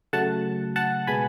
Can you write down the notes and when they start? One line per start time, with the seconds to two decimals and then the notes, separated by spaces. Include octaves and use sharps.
0.13 C#3 F#3 A3 F#5 A5
0.76 F#5 A5
1.07 B2 G#3 B3 G#5 B5